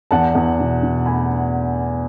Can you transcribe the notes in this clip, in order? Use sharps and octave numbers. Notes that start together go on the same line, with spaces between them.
E2 F#5 A5
E2
B2
B2
A3 G#5 B5